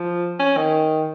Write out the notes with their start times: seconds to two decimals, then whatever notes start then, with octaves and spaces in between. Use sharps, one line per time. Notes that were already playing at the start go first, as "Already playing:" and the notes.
Already playing: F3
0.39 C#4
0.57 D#3